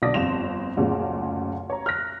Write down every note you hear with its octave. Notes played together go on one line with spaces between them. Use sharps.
B1 B2 D3 D5 D#6 A#6
G1 F2 C6 E7 F7
F#1 D2 A#2 C#4 G#4
C#5 A#5
F6 F#6 A#6